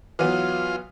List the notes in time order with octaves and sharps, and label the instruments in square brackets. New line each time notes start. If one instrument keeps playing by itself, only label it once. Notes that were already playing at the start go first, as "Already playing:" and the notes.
[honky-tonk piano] E3 F#3 B3 [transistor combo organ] F4